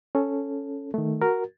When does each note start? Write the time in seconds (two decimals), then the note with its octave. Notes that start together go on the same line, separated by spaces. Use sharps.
0.15 C#4 A4
0.94 D#3 A3
1.22 F#4 A#4